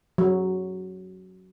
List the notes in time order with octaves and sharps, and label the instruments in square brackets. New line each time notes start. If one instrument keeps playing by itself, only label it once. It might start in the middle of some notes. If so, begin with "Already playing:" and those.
[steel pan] F#3